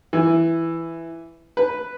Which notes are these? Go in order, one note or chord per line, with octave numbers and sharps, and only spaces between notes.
E3
B4